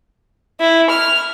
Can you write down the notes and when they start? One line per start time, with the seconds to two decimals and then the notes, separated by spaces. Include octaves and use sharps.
0.60 E4
0.90 F6